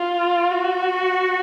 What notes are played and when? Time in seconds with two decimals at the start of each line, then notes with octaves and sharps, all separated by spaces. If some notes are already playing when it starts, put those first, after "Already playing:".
Already playing: F4
0.50 F#4